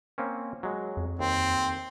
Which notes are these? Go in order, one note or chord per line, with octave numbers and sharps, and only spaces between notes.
A#3 C4 C#4
F#3 G#3
F2
D#2 C4